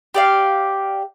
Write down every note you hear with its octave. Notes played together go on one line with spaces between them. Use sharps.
G4 D5 F5